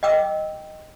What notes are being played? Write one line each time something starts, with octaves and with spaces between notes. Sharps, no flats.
D#5 G5 D6 E6